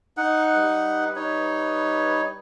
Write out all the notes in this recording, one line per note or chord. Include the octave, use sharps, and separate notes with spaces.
D#4 F#5
G3 B4
D#4 C#5